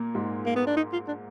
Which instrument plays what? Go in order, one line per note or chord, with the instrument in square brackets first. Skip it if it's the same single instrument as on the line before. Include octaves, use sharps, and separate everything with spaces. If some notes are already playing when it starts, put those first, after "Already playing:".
Already playing: [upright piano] A#2 A#3
G#2 G#3
[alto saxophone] A#3
B3
D4
D#4
F4
D4